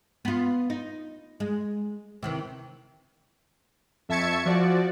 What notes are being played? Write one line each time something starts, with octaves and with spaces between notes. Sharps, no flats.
B3 F4
D#4
G#3
C3 D#3 E3
F2 E5 A5 C#6 G#6 C#7
F3 F#4 D5